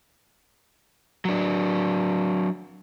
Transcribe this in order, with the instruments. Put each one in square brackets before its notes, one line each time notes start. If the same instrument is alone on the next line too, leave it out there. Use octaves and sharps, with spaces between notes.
[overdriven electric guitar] F#3 D4